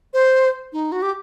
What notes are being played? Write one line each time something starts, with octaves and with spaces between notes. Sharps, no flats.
C5
D#4
F#4
G4